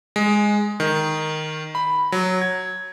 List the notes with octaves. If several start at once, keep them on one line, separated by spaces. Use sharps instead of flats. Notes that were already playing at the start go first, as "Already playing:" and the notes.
G#3
D#3
B5
F#3
G#6